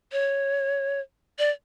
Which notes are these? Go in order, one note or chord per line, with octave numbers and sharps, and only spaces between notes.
C#5
D5